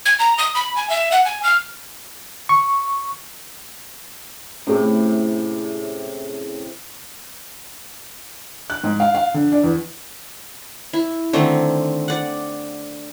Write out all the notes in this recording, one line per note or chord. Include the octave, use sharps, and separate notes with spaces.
G#6
A#5
D#6
B5
G#5
E5
F#5
G#5
F6
C#6
A2 C3 C#4 G#4
F#6
G#2
F5
F5
D3
D4
E2
E4
D3 D#3 A3 C4
D5 F#5